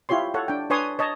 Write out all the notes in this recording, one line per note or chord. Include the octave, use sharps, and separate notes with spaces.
E4 F4 G4 C#5 C6
A4 C#5 F#5
D4 G5
D4 B4 C#5 G#5 C6 D#6
C#5 D#5 A5